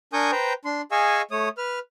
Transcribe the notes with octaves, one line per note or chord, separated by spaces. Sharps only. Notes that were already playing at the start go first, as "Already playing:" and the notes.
D4 A#4 G#5 C#6 D#6 G6
B4 C5 G5 A#5
D4 C6
G#4 D#5 F5 G#5 C#6 E6
A3 C#5 D#6
B4 F6